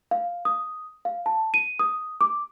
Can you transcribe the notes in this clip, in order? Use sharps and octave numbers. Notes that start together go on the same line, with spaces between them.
F5
D#6
F5
A5
D#7
D#6
D6